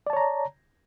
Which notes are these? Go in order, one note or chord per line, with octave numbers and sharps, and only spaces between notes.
C#5 D5 A5 A#5